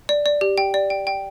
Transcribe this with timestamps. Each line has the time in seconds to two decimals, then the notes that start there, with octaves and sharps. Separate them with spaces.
0.09 D5
0.26 D5
0.41 G4
0.58 G5
0.74 D5
0.90 G5
1.07 G5